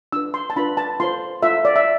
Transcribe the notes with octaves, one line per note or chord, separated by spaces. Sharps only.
D4 F4 B4 E6
C6
A5
D4 F4 B4 B5
A5
F4 A4 C5 C6
F4 A4 C5 E5
D5
E5